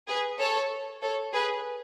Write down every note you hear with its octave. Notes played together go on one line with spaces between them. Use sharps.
G#4 B4
A4 C#5
A4 C#5
G#4 B4